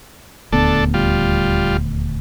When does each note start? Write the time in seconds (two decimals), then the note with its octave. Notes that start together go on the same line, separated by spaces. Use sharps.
0.52 D#1 D2 B3 D4 A4
0.94 G3 F4